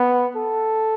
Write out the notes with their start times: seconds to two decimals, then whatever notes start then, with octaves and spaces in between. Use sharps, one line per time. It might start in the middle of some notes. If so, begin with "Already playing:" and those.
Already playing: B3
0.37 A4